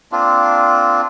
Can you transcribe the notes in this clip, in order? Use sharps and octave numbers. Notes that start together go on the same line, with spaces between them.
A#3 C4 D4 F4